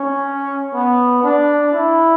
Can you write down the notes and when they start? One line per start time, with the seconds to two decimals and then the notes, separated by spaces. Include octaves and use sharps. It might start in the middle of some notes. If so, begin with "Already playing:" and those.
Already playing: C#4
0.74 B3
1.23 D4
1.73 E4